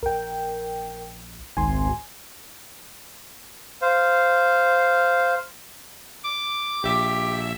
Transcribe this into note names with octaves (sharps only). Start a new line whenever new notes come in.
A#1 A#4 G5
G#1 C#2 G#5 C6
C5 F5
D6
A#1 G4 E5